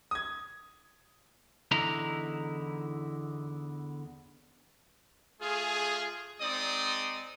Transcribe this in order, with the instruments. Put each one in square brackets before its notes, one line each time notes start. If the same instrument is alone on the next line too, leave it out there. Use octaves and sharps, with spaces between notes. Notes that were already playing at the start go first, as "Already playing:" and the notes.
[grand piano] D#6 G#6
[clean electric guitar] E2 D3 D#4 E4 A#5
[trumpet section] A3 F4 G#4
G#3 C4 D#4 D5 D#6